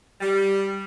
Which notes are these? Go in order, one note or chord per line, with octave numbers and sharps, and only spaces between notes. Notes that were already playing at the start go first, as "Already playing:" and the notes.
G3